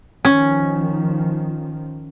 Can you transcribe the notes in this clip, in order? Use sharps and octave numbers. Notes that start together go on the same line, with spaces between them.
D#3 F3 C#4